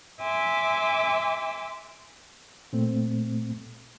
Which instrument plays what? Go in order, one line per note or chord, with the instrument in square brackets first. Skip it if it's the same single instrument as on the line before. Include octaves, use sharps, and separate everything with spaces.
[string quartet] E5 G#5 C6 D6 E6
[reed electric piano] A#2 A3 C4